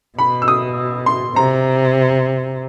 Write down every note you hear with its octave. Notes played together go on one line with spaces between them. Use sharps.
B2 B5
E6
D#6
C6
C3 A#5